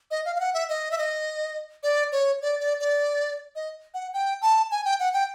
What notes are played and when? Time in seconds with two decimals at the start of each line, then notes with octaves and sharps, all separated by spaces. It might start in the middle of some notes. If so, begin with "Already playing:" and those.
0.11 D#5
0.25 F5
0.36 F5
0.40 F#5
0.54 E5
0.69 D#5
0.91 E5
0.98 D#5
1.83 D5
2.12 C#5
2.42 D5
2.60 D5
2.80 D5
3.55 D#5
3.94 F#5
4.14 G5
4.42 A5
4.71 G#5
4.85 G5
4.99 F#5
5.13 G5